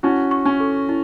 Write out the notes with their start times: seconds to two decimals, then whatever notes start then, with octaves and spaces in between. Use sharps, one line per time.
0.03 C#4 E4 F#4
0.31 C#6
0.45 C#4
0.60 A4
0.89 E4